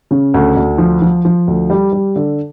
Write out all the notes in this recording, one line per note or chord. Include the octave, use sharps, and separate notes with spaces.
C#3
D2
D2
F3
F3
F3
D2
G3
G3
D3